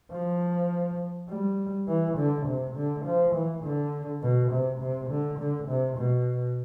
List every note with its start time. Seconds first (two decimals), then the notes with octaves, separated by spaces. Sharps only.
0.12 F3
1.29 G3
1.88 E3
2.17 D3
2.47 C3
2.76 D3
3.05 F3
3.35 E3
3.64 D3
4.22 B2
4.52 C3
4.81 C3
5.10 D3
5.39 D3
5.69 C3
5.98 B2